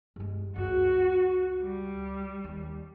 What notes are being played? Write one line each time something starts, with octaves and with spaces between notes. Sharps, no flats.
G2 G#3
C#2 F#2 F#4
G3
D#2